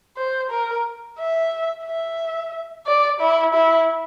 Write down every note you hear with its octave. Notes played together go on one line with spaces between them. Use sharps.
C5
A#4
E5
E5
D5
E4
E4